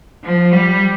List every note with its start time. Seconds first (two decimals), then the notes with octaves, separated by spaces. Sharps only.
0.24 F3
0.52 G3